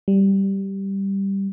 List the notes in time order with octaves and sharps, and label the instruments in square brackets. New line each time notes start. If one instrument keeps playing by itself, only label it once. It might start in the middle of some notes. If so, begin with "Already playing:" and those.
[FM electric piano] G3